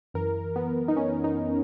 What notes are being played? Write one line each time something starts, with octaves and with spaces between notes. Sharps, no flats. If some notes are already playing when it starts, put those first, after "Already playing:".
F#2 E3 A#4
B3
D#4
C#4
D#4